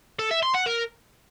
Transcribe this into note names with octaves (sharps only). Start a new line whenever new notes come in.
A4
E5
C6
F#5
A#4